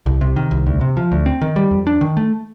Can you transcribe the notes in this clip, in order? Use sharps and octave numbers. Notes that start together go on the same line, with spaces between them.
C2
C3
D#3
C2
D2
C3
F3
D2
C4
D#3
G3
F2
D4
D#3
A3